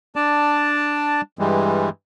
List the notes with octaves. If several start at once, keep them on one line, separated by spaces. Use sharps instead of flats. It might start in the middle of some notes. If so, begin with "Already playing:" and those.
D4 D5 A5
G2 E3 G3 G#3